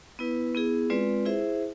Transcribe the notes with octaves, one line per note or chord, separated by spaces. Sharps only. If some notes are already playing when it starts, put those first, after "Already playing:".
B3 E4 B4
B3 E4 G#4
G#3 C4 F4 B4 D5
E4 G#4 C5 E5